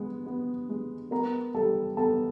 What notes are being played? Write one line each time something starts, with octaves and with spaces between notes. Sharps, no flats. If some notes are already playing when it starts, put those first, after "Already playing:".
Already playing: G#3 B3
B3
G#3
B3 A#4 A#5
G3 A4 A5
B3 A4 A5